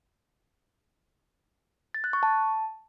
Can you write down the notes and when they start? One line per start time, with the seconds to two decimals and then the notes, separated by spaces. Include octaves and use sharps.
1.94 A6
2.04 F#6
2.13 C#6
2.23 A5